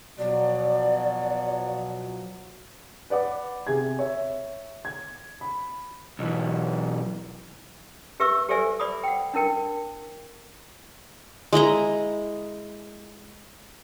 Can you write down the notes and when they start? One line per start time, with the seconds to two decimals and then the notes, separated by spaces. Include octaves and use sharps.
0.18 B2 F3 F#3 D5
3.10 B4 D5 F#5 D6
3.67 C3 G#4 G#6
3.99 C#5 E5
4.85 G#6
5.41 B5
6.19 B1 E3
8.20 G4 B4 E5 C#6 E6
8.49 G4 A4 C5 D5 E5 G#5
8.79 D5 B5 D6 D#6
9.04 F#5 G5
9.34 D4 E4 A#4 G5
11.53 G#3 E4 D#5 A#5